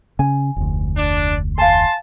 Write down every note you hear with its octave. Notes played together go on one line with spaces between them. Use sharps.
C#3 C#4 G#5
F1 D2
D4
F5 G#5 A5 C6